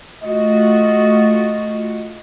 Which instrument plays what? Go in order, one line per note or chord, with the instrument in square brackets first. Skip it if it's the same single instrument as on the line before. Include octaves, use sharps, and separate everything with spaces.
[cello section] A3 F4 F#4 [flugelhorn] D#5